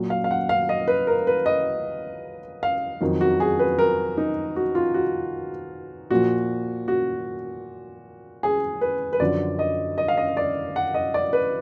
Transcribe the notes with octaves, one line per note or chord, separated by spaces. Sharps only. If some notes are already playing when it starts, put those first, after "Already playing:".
Already playing: A#2 F#3
F5
F5
F#5
F5
D#5
B4
A#4
B4
D#5
F5
F2 D#3 F#3
F#4
G#4
B4
A#4
D#4
F#4
F4
F#4
A#2 F3 F#4
F#4
G#4
B4
B4
F#2 D3 F3 D5
D#5
D#5
F5
D#5
D5
F#5
D#5
D5
B4